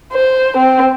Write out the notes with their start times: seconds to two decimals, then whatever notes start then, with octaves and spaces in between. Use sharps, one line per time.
0.13 C5
0.57 C4